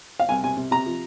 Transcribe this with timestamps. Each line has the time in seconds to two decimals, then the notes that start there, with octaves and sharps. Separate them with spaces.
0.19 F5
0.29 C2 G#5
0.43 C3 G#5
0.57 C3
0.71 C3 A#5
0.86 F3